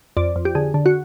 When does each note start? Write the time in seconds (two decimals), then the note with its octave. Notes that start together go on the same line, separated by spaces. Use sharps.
0.17 F2 D5
0.36 F2
0.45 G4
0.55 D3 G#4
0.74 D3
0.86 F#4